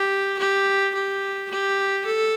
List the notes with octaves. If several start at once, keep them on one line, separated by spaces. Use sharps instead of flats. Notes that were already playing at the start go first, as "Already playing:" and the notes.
Already playing: G4
G4
G4
G4
A4